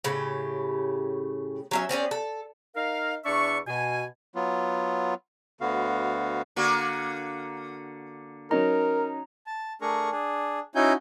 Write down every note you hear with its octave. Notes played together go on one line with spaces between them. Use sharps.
A2 C#3 G4
F#3 C#4 E5
C4 C#4 G#4 D5
A4
D#4 A#4 F5
E2 D4 D5 E5 C#6
B2 G#5
F#3 B3 F4
D2 D3 B3 F#4 F5
D3 A#3 F#4
F#3 C#4 D#4 A#4 A#5
A5
A3 D4 G#4 A#4 A#5 C#6
D4 G#4
C#4 D#4 E4 F#4 G#5 G6